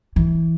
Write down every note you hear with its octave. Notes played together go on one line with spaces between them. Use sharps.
E3